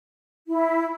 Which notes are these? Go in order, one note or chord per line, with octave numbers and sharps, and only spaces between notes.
E4